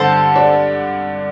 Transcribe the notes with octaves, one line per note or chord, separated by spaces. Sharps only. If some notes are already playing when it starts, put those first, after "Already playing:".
Already playing: G2 D3 A4 C5
D4